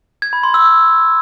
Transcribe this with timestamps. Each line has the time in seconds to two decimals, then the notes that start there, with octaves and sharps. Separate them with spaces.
0.22 G#6
0.33 B5
0.43 C6
0.54 E6